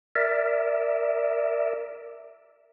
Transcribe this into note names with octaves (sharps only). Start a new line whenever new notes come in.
A#4 D5 E5